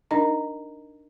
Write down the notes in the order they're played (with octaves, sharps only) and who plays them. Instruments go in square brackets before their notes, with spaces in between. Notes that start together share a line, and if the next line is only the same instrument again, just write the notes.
[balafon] D4 D#4 A#4 D#5 A#5